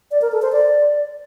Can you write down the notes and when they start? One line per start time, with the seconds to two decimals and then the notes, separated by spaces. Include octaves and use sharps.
0.11 D5
0.21 A#4
0.32 A4
0.42 C5
0.52 D5